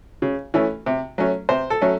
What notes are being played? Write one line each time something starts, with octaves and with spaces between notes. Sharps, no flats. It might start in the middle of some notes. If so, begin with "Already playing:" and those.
C#3
E3 A3 C#4
C3
F#3 A3 C#4
C3 C5
A4
F#3 A3 C#4